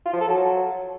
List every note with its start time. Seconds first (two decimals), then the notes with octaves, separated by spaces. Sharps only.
0.06 F4
0.13 F3
0.21 A4
0.28 F#3